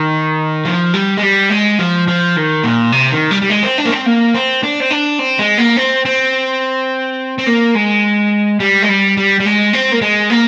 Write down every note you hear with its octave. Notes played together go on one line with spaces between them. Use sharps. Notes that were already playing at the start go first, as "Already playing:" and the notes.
Already playing: D#3
F3
G3
G#3
G3
G#3
F3
F3
D#3
A#2
C3
D#3
G3
G3
G#3
C4
D4
A#3
C4
A#3
C4
D4
C4
D4
C4
G#3
A#3
C4
C4
C4
A#3
G#3
G3
G#3
G3
G3
G3
G#3
C4
A#3
G#3
A#3